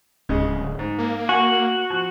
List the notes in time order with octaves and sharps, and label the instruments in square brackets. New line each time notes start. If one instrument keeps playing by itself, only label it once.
[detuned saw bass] D1 [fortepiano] C#3 G#3
[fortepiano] G#2
[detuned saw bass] A#3
[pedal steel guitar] F#4 [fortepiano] G#5
[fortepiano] F3